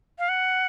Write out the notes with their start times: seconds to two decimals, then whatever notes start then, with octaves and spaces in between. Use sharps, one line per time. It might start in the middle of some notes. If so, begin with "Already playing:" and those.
0.19 F5
0.29 F#5